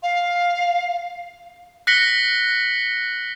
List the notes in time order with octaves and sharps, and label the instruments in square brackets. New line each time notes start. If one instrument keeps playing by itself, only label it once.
[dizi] F5
[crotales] F#6 A#6 B6 C#7 F#7 G7